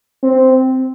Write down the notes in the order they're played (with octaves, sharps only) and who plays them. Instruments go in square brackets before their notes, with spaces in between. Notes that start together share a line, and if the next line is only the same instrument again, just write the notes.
[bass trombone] C4